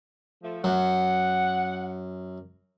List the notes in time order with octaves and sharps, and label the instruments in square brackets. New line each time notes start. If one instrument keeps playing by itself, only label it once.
[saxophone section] F3 A3
[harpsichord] F#2 [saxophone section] F#5